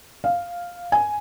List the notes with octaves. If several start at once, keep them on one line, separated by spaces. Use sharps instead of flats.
F5
G#5